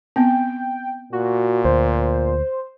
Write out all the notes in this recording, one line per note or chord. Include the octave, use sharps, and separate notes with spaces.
B3 C4 G5
A#2 F#4
D2 C5